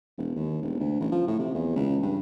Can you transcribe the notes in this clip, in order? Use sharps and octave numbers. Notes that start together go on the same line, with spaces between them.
E1
D#2
E1
D2
A1
F3
A2
C3
E2
C#2
G2